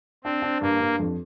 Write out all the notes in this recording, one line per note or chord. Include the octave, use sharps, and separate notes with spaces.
C4 D4
D4
G2 A#3
G2
F2